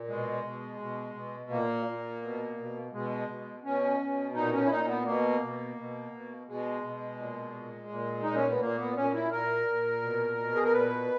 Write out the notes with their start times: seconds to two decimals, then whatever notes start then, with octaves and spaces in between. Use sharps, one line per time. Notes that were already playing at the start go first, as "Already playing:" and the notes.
Already playing: A#2
0.08 B2 G#3
0.44 B2
0.80 B2
1.14 B2
1.50 A#2 A#3
1.86 A#2
2.22 B2
2.57 B2
2.92 B2 G#3
3.29 B2
3.64 B2 C#4
3.99 B2
4.34 A#2 D#4
4.52 C#4
4.66 E4
4.70 A#2 D#4
4.88 B3
5.05 B2 A#3
5.41 B2
5.77 B2
6.11 B2
6.47 B2 G#3
6.83 B2
7.18 A#2
7.54 A#2
7.89 A#2
8.23 A#2 D#4
8.35 C#4
8.48 B3
8.60 A#2 A#3
8.78 B3
8.96 A#2 C#4
9.14 E4
9.31 A#2 A#4
9.66 A#2
10.02 B2
10.37 B2
10.55 G#4
10.64 A#4
10.73 A#2 B4